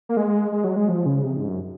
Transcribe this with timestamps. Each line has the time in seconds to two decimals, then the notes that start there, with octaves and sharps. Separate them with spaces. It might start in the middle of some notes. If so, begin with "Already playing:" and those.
0.09 A#3
0.17 G#3
0.52 G#3
0.64 F#3
0.76 G#3
0.89 F3
1.06 C#3
1.24 C3
1.37 G#2
1.48 F#2